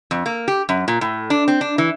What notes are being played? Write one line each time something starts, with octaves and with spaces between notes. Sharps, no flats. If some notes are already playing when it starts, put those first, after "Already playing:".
F2
A#3
G4
F#2
A#2
A2
D4
C4
D4
E3